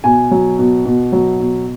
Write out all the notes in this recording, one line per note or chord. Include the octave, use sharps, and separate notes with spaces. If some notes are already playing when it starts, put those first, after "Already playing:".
B2 G#5
F#3
B2
B2
F#3
B2